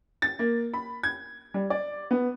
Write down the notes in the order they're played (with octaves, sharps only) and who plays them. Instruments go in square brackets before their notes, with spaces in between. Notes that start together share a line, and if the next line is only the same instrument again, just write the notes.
[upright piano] A6
A#3
B5
G#6
G3
D5
B3